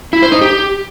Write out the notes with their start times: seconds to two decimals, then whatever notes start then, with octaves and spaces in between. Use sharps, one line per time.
0.13 E4
0.22 C5
0.32 D#4
0.41 G4